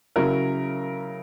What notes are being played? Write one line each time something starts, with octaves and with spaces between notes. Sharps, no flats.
C#3 F#3 C#4 E4 A#4